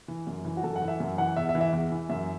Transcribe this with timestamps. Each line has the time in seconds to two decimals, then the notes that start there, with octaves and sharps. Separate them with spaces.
0.08 E3
0.27 F#2
0.45 E3
0.57 F#4
0.64 F#2 A4
0.76 F#5
0.82 E3
0.88 E5
1.00 F#2
1.18 E3 F#5
1.36 E2 E5
1.49 E5
1.55 E3
1.61 E5
1.73 E2
1.92 E3
2.10 F#2 E5